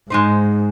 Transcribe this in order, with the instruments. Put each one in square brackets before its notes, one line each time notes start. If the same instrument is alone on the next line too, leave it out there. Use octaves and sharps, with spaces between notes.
[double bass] G#2 [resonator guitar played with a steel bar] G#3 D#4 C5